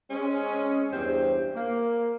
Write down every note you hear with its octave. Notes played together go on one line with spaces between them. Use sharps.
G#3 C4 C#4
E2 G2 C4 G4 C5
A#3